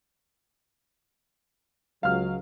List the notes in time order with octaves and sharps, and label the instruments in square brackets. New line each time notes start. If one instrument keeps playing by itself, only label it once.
[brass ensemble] C#2 F#3 [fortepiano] F5 F6